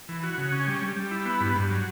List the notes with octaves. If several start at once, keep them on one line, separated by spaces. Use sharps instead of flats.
E3
F#4
C#3
C#4
G3
G3
G3
E4
B3
G2
G2
F#3